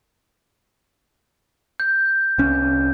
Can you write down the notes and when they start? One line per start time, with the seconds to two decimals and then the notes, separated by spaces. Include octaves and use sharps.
1.80 G6
2.38 C2 C#4